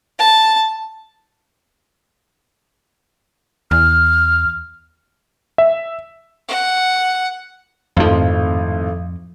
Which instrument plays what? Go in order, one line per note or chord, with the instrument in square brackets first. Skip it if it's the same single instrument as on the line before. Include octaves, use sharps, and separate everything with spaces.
[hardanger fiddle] A5
[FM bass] E2 [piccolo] F6
[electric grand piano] E5
[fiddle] F#5
[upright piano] G#1 A2 F5 [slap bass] F2 F3